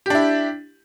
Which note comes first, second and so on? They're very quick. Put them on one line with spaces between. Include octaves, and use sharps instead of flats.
G4 D4 E4